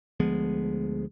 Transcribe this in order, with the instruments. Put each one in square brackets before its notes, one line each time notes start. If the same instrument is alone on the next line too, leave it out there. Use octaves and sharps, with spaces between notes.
[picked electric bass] D2 F3 G#3 B3